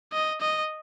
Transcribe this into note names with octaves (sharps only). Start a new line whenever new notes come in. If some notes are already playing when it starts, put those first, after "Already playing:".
D#5
D#5